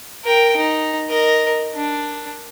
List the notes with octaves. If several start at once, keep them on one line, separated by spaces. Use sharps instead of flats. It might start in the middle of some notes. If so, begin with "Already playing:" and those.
A#4 G5
D#4
A#4 D#5
D4